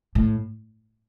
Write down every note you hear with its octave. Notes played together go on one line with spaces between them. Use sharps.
A2